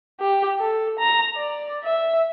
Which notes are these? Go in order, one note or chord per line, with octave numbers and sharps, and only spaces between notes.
G4
A4
A#5
D5
E5